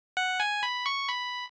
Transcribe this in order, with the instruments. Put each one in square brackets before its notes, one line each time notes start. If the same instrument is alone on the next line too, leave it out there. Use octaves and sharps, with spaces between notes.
[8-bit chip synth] F#5
G#5
B5
C#6
B5